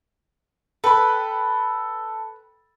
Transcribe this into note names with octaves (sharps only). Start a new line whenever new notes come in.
A4 B4 G5 B5